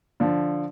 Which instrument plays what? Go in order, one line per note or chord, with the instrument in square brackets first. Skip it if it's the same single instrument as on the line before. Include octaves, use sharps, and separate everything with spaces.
[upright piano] D3 F3